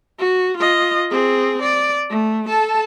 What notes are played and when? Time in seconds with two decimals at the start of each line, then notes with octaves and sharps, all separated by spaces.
0.18 F#4
0.57 F4 D#5
1.10 C4 G#4
1.62 D5
2.10 A3
2.47 A4 A5